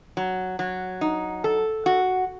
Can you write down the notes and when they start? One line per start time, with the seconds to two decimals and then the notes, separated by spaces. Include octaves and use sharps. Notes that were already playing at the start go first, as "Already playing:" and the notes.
0.17 F#3
0.59 F#3
1.01 D#4
1.44 A4
1.86 F#4